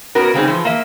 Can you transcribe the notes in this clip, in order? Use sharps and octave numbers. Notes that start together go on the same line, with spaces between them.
B3 C#4 F#4 A#4
C#3 G#3 C4 C#4 D#4 G#4
E3 F3
A#3 E5